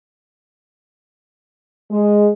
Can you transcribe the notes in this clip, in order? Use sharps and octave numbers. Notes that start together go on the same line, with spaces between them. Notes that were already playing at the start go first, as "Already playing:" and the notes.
G#3